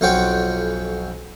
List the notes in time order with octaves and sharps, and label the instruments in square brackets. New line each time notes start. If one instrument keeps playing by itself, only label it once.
[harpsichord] B1 F2 C4 C#4 F#5 G5